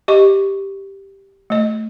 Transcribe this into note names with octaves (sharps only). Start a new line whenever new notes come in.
G4 D#5 C#6
A3 D#5